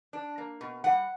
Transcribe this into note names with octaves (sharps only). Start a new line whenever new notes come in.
D4
A#3
B2
G3 F#5